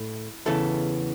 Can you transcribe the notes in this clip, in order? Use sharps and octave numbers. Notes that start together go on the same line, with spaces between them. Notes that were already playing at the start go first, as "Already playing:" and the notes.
Already playing: A2 A3 E4
E2 C#3 E3 A4